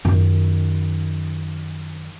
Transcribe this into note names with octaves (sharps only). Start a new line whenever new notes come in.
F#2 D#3